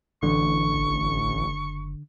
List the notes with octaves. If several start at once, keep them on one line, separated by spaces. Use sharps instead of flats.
A1 D3 E3 C#6
F#1